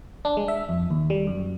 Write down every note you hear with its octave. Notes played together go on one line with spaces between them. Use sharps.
D4
G#3
E5
F2
D#2
G3
F#2